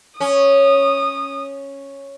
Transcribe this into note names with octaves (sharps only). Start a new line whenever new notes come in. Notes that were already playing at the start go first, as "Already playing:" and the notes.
C#4 D#6